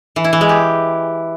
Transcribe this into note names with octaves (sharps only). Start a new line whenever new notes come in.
E3
E4
E3
G#3
G4